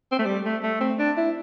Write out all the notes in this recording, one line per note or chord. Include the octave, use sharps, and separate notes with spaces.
C4
A3
G3
A3
A3
C4
D4
E4